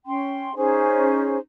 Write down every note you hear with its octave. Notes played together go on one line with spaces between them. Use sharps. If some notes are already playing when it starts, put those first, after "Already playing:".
C#4 G5 C6
C#4 D#4 G#4 C5